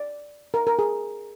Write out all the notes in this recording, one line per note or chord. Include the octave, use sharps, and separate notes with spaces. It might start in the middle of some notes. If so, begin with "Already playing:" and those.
Already playing: D5
A#4
A#4
G#4